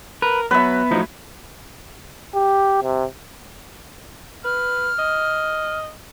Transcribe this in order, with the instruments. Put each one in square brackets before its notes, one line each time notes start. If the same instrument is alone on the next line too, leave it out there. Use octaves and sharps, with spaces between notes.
[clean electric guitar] A#4 [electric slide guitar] B4
[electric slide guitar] F#3 [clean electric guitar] B3 [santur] B4 E5
[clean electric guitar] A2 F#3 [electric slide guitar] F3 D#4
[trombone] G4
C3
[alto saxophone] B4 [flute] F6
[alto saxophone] D#5